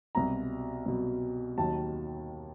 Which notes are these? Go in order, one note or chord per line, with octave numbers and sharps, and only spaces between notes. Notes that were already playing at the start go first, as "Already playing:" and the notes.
C2 B2 F#3 A#5
C2 B2 F#3
D#2 D#3 F#3 A5